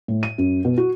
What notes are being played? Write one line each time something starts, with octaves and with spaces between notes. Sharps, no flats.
A2
D#7
F#2
B2
F#4